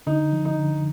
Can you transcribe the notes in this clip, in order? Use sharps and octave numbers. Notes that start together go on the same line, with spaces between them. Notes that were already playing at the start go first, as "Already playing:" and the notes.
D3 D#4
F3
D#4
D3